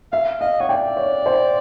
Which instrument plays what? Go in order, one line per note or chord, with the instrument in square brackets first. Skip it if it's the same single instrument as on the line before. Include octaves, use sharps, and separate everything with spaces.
[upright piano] E5 [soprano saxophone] F5
[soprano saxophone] D#5 [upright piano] F5
[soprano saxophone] C#5 [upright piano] F#5
[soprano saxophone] D5 [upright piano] G5
[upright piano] C#5
C5